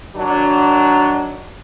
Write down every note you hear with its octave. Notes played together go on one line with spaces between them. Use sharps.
D#3 F#3 D4